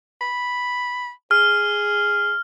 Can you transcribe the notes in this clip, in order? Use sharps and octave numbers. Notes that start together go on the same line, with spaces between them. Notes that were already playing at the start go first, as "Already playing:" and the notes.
B5
G#4 F6